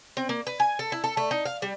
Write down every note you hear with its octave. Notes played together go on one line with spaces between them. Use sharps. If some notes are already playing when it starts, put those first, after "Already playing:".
C4
A#3
B4
G#5
A4
E4
A4
A3
D#4
F5
G3